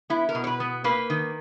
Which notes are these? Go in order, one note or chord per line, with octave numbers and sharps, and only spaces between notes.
B3 E4
A#4
B2
C#5
B4
B3
A#3 B4
D#3